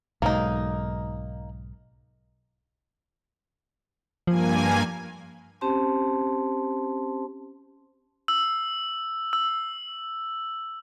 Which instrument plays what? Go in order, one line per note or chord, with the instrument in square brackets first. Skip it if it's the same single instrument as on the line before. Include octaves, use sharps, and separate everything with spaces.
[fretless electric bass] B1 G#2 [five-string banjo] A#3 D#4
[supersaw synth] G2 A#3 G#5 [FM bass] F3
[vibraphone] C4 C#4 G4 C5 A5 C6
[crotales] E6
E6